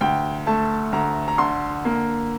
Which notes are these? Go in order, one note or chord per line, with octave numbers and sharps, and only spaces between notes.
D2 G5
A3 A5
D2 A#5
A#5
D3 C6
A#3